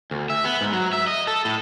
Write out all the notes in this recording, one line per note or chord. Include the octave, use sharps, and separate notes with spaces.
D2
E5
B3
G#2
F#3
E5
D#5
A4
A2